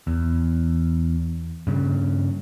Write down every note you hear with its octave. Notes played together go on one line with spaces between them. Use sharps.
E2
G2 C#3